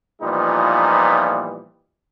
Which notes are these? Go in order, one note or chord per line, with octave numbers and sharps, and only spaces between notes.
A#2 E3 F3 G3 B3 D#4